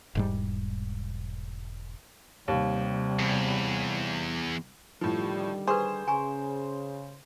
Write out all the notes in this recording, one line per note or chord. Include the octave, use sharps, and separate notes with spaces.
E1 G#2 G3
D#2 C3 G3
E2
A2 D3 D#3 F3 G3
G#4 B4 C5 C#6
C#3 G#5 A#5 C#6